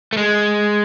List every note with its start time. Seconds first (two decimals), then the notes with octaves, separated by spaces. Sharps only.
0.13 A3
0.17 G#3